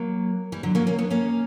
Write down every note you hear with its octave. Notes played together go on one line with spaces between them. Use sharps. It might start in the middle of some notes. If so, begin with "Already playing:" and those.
Already playing: F#3 A#3
E3 G3
D3 F#3
F#3 A#3
A#3 C#4
B3 D4
A#3 C#4